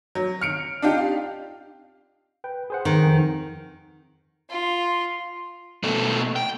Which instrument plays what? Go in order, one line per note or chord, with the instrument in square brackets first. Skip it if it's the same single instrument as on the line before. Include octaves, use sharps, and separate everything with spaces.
[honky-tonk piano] F#3
F6 C#7 D7
D4 D#4 F4 G4
F5
[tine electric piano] B4 G5
G#4 C5 F#5
[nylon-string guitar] D#3
[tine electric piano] F2
[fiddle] F4
[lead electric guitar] B2 A3
G5